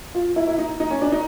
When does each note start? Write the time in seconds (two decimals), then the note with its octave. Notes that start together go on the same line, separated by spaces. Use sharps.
0.15 F4
0.36 E4
0.47 E4
0.58 D#4
0.80 D#4
0.91 C#4
1.02 D4
1.12 D#4